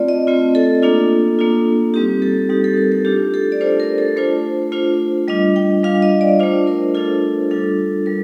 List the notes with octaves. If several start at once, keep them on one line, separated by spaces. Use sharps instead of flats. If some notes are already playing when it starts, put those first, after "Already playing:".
Already playing: A3 C4 F4 D5
D#5
A3 C4 F4
A4
A#3 D4 F4
A#3 D4 F4
G3 C4 D#4 G4
A4
G3 C4 D#4 G4
A4
A#4
A4
A3 D4 F4 G4
A4
D5
A3 D4 F4 C5
A#4
A4
A3 D4 F4 C5
A3 D4 F4 C5
G3 D4 F4 D#5
G5
G3 D4 F4 F5
D#5
D5
A3 D4 F4 C5
A#4
A3 D4 F4 A4
G3 D4 F4 A4
G3 A#4